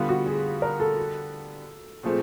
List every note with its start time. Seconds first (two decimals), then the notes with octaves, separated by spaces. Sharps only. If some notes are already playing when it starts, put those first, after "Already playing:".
Already playing: D3 G3 B3 F4
0.09 F#4
0.26 G#4
0.62 A#4
0.80 A4
2.03 A#2 F3 A3 C4 G#4